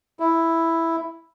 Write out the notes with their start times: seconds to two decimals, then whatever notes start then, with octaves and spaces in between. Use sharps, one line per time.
0.20 E4